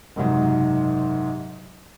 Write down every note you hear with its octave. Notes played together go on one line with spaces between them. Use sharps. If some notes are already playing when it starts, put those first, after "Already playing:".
F#1 G#2 C3 F#3 D#4